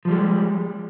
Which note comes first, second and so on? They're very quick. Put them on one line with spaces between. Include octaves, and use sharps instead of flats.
F3 G3 G#3